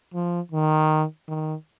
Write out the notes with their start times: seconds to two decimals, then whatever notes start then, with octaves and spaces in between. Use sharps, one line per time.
0.14 F3
0.52 D#3
1.28 D#3